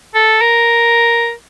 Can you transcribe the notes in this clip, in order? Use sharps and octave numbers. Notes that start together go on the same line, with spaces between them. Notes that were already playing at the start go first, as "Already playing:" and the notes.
A4
A#4